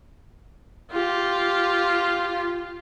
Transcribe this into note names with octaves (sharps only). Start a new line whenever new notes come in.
F4 G4